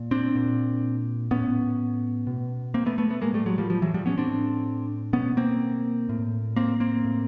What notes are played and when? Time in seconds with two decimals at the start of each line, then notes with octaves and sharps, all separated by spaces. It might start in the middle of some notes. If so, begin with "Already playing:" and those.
Already playing: A#2
0.11 C4 D4
0.35 A#2
1.31 A2 B3 C#4
2.27 B2
2.74 A#3 C4
2.86 A3 B3
2.98 A3 B3
3.10 A3 B3
3.22 A2 G#3 A#3
3.34 G3 A3
3.46 F#3 G#3
3.58 F3 G3
3.70 F3 G3
3.82 E3 F#3
3.94 F3 G3
4.06 B3 C#4
4.18 A2 C4 D4
5.13 B2 B3 C#4
5.37 A#3 C4
6.09 A2
6.56 A#3 C4
6.80 A#3 C4
7.05 A2